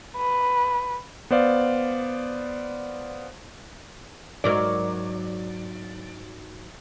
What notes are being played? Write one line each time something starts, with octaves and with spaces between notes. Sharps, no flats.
B4
B3 C5 D5 F5
G#2 F#3 A#4 D5